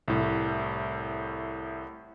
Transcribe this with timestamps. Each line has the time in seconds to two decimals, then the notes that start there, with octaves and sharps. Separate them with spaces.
0.08 C2 A2